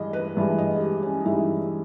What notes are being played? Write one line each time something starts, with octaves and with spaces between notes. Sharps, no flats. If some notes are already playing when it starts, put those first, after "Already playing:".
Already playing: G2 E3 G#3 D#5
B4
G2 E3 G#3
D#5
G#4
G4
C#4
D#4
G2 E3 G#3 E4